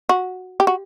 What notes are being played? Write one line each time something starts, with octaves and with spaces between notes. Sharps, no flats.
F#4
G4
F#4